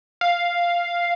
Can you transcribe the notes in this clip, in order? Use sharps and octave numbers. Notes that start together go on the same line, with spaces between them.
F5